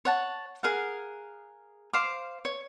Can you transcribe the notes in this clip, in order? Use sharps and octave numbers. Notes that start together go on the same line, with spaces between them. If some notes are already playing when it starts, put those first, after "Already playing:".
C#5 F#5 A5
G#4 A#4 F5 F#5
C5 F5 D6
C#5